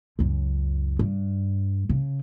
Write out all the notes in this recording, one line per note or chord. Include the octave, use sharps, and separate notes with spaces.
C#2 F#2
G2
C#3